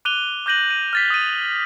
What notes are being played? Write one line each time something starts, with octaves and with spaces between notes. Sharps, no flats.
D6 F#6 D#7 F7 G7
D6 F#6 G6 A#6 D#7 F#7
D#7
F6 A6 B6
D#6 D#7